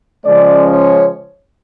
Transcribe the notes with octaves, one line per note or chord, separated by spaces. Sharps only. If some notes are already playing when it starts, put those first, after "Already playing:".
C#3 F3 G#3 C#4 D5
C#5